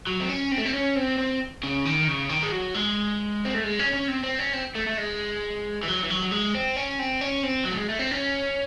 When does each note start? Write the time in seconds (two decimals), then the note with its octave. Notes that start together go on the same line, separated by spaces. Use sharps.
0.07 F#3
0.20 C4
0.29 C#4
0.51 C4
0.58 A3
0.65 C4
0.73 C#4
0.96 C4
1.18 C4
1.63 C#3
1.85 D#3
2.08 C#3
2.29 D#3
2.43 G#3
2.52 F#3
2.74 G#3
3.45 C4
3.54 A3
3.64 G#3
3.79 C#4
3.94 C#4
4.08 C4
4.24 C4
4.39 C#4
4.53 C4
4.75 A3
4.87 A3
4.98 G#3
5.83 E3
5.88 F#3
6.03 E3
6.10 F#3
6.23 F#3
6.32 G#3
6.55 C4
6.76 C#4
6.99 C4
7.21 C#4
7.43 C4
7.66 F#3
7.72 A3
7.77 G#3
7.89 A3
7.99 C4
8.11 C#4